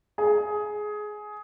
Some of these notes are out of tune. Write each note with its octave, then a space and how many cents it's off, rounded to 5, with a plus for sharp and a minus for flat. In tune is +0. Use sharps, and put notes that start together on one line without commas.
G#4 +15